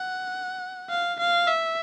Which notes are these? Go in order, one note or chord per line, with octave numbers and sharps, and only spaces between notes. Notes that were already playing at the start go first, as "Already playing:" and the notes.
Already playing: F#5
F5
F5
E5